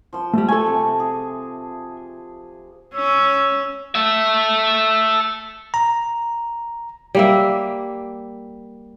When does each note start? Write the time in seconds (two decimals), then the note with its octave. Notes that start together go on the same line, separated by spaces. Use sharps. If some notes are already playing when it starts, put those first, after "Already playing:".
0.13 F3 C6
0.34 G3 A3
0.49 A3 A4 G#5
0.66 C3
1.00 G#4
2.94 C#4 E6
3.95 A4 E5
5.74 A#5
7.15 G3 A#3 E5